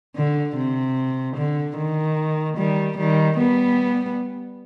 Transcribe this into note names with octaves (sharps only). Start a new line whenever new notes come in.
D3
C3
D3
D#3
D#3 G3
D#3 G3
G3 B3